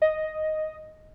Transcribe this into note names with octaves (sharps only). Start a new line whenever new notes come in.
D#5